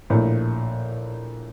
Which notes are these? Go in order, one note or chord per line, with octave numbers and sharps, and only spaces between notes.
A#1 A2